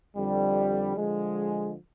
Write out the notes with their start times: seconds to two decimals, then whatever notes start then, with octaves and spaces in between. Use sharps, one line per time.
0.15 F2 D3 G3
0.95 D3 F3 G#3